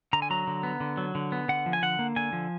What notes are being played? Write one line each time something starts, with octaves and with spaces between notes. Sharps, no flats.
D3 A#5
G#5
F#3 A#5
D3
B3
D3
F#3
D3
B3
D3 F#5
F3
G#5
D3 F#5
A#3
D3 G#5
F3